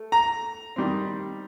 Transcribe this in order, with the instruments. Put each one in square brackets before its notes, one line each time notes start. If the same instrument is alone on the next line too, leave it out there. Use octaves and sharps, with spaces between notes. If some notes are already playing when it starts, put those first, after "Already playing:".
Already playing: [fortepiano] A3
[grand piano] A#5
[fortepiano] D#3 G3 C4